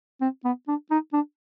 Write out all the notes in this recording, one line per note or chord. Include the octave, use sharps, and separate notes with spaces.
C4
B3
D4
D#4
D4